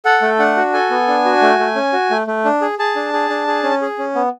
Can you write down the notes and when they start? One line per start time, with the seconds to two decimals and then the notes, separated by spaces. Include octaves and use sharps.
0.05 A4 F#5
0.22 A3
0.39 D4 F#5
0.57 F#4
0.74 A4 G#5
0.90 B3
1.08 D4
1.25 F#4
1.42 A3
1.59 A3
1.75 C#4
1.93 F#4
2.11 A3
2.27 A3
2.45 D4
2.61 G#4
2.79 G#4 A5
2.96 D4
3.13 G#4
3.30 D4
3.47 G#4
3.63 C#4
3.82 G#4
3.98 C#4
4.15 B3